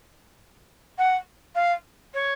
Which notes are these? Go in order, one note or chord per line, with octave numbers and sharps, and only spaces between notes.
F#5
F5
C#5